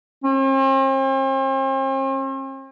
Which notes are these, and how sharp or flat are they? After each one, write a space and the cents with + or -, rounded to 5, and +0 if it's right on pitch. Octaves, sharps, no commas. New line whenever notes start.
C4 +45